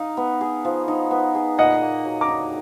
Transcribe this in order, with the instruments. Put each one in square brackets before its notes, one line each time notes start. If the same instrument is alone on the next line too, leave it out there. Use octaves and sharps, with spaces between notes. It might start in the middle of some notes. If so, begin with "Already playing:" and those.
Already playing: [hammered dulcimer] D#4 [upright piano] F5
[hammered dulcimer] B3
G#4
F3
D#4
B3
G#4
[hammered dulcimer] A#2 [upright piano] D#5 F#5
[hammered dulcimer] A#3
F#3
[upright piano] A#5 D6
[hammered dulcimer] D#4